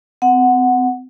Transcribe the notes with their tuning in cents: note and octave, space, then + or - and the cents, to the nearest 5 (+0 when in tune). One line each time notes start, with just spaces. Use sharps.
C4 -35 F#5 +0